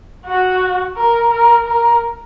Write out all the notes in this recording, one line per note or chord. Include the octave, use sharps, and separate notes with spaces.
F#4
A#4
A#4
A#4